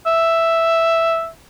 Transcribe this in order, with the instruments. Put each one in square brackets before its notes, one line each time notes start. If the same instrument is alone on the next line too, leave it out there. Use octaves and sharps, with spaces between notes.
[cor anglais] E5